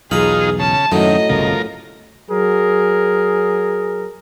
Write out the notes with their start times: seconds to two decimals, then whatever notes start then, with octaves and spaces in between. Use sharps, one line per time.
0.11 B1 E2 D#4 F4 G#4 A#5 B5
0.59 C#3 A5
0.92 F#2 A2 D#3 F#3 D#5
1.29 G1 C2 C#3 F3 A#4
2.30 F#3 G#4 A#4